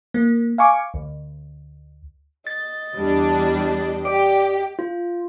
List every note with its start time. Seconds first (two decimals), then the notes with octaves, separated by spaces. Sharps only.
0.14 A#3
0.58 F5 G#5 C#6 D6
0.94 D2
2.47 D#5 A6
2.94 E2 G3 D4
4.05 G4 D5
4.79 F4